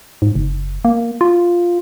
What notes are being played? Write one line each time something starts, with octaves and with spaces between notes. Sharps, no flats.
G#2
F#1
A#3
F4